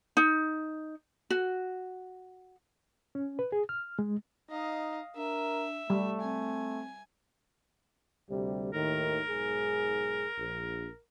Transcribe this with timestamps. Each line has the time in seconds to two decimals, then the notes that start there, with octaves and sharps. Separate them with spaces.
0.17 D#4
1.30 F#4
3.15 C#4
3.39 B4
3.52 G#4
3.69 F6
3.99 G#3
4.51 D#4 D#5 F5
5.17 D4 A#4 E5
5.90 G3 A3
6.21 C4 G#5
8.29 D2 C3 G3
8.73 D#2 A2 D#3 A#4
9.27 B1 G#2 G#4
10.38 A#1